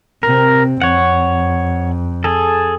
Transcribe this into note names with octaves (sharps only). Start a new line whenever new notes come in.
C3 C4 A#4
F2 C#5 F#5
G#4 A4